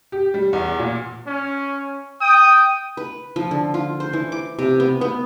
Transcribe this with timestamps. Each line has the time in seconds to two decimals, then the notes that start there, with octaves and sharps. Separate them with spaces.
0.12 G4
0.34 G3
0.53 E2
0.79 A#2
1.28 C#4
2.22 G5 D#6
2.97 B4
3.36 F3
3.51 D3
3.74 F4
4.00 C5
4.13 E3
4.32 D6
4.59 C3
4.80 B3
5.01 B3